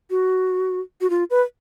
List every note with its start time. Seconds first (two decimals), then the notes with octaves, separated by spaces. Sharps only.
0.10 F#4
1.01 F#4
1.10 F4
1.30 B4